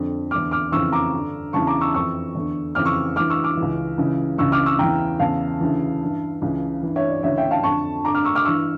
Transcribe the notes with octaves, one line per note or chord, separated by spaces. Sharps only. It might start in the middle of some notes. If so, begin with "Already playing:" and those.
Already playing: F2 D3
E2 D3 D6 F6
D6 F6
F2 C#3 E3 C#6 E6
A#5 D6
G2 D3
E2 C#3 E3 A5 C#6
A#5 D6
C#6 E6
F2 E3 C#6 E6
E2 D3
F2 C#3 E3 D6 F6
C#6 E6
G2 E3 D6 F6
C#6 E6
D6 F6
C#2 C#3 E3
C#2 C#3 E3
C#2 C#3 E3 C#6 E6
D6 F6
C#6 E6
E2 C#3 E3 G5 A#5
E2 C#3 E3 F5 A5
D2 C#3 E3
G2 E3
C#2 C#3 E3
G2 E3
C#5 E5
D5
D2 C#3 E3 C#5 E5
E5 G5
F5 A5
F2 D3 A5 C#6
G2 D3 A#5 D6
D6 F6
C#6 E6
D6 F6
G2 E3 C#6 E6